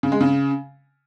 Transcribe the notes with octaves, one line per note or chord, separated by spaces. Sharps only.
C#3
G#3
C#3